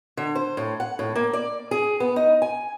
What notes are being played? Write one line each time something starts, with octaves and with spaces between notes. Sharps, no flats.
D3
C5
A2
F#5
A2
A#3
D5
G#4
B3
D#4
G#5